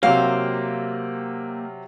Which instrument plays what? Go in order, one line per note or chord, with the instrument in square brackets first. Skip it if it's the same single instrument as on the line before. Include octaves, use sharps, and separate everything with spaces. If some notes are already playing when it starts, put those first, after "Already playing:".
[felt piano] C3 F#3 [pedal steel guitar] A#3 G4 C5 [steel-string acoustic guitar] F5